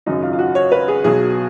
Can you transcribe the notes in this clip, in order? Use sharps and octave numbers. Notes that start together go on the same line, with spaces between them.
G#1 F#2 C#3 F#3 D#4
F4
F4
F#4
C#5
B4
G#4
B1 B2 F#3 G#4